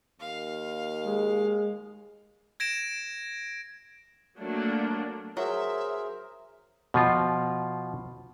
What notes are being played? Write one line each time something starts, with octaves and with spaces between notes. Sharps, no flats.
D#2 F5
G#3
G#6 A#6 D7 E7
F#3 A3 A#3 D4
F#3 G#4 A#4 C5 E5
B2 F3 F4